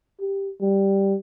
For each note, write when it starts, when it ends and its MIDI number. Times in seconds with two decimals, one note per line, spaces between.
0.20 0.49 67
0.61 1.15 55